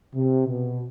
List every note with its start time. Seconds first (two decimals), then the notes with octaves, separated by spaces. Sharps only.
0.15 C3
0.48 B2